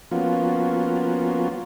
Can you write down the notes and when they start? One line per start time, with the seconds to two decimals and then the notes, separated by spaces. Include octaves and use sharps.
0.11 F3 A#3 B3 C#4 F4 F#4